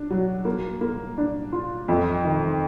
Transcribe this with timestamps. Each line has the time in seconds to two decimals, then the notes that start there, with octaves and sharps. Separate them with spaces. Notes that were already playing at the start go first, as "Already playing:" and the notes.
Already playing: D4
0.10 F#3
0.45 A#3
0.81 A#3
1.18 D4
1.52 F4
1.88 F2
2.25 D#3